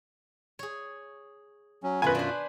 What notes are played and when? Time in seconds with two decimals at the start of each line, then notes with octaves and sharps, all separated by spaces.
0.59 G#4 C#5
1.83 F#3 C#4
2.02 F#2 B2 D#3 F4 B4 G#5
2.15 D4 C5